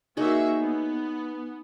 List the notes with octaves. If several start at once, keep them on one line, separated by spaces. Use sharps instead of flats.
A#3 D#4 F#4 G#4 C#5 E5
B3